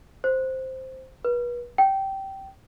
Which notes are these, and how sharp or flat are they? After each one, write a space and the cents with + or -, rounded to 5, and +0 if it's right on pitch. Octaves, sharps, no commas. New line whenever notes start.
C5 +0
B4 -35
G5 -15